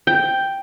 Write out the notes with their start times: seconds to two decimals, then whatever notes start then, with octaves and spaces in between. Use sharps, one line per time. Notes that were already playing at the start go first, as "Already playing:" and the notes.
0.07 G5